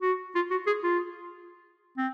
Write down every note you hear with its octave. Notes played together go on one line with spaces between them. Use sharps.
F#4
F4
F#4
G#4
F4
C4